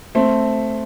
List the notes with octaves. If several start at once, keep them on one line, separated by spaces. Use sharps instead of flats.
A3 C4